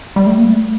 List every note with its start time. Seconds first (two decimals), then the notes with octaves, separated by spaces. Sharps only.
0.16 G3
0.27 A3
0.38 A#3
0.48 A3